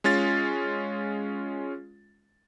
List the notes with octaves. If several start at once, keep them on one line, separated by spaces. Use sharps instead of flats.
G#3 C#4 F4 A6